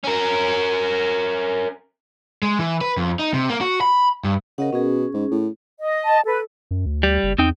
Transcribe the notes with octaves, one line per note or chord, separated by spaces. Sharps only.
C#4 A#4
G#3
E3
B4
F2
D#4
C3
A#3
F#4
B5
G2
C#3 A#4 D#5 F#5
B2 C#4 G#4
G#2
A2
D#5
A5
A4 B4
F#2
D2
G3
F#1
E2 C4 D#4 G5